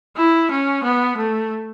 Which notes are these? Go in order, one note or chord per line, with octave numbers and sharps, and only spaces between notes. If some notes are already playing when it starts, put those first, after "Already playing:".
E4
C#4
B3
A3